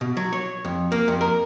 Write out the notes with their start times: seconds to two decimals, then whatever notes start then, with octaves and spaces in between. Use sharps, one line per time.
0.01 B2
0.17 F#3
0.33 C#5
0.65 F2
0.92 A#3
1.08 F2
1.21 A#4